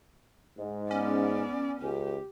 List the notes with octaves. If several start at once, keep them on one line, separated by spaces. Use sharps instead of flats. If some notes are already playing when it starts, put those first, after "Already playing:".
G#2
B3 C#4 D5
C#2 G4